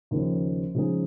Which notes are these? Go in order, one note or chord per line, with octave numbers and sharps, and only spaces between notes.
D#2 C#3 F3
C#3 F3 G#3 D#4 G#4